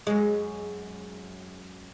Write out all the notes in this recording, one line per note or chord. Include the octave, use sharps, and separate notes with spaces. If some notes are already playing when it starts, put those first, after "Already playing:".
F#2 G#3